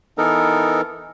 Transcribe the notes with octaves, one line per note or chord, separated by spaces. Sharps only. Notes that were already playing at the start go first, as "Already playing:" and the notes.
E3 B3 D#4 A4 A#4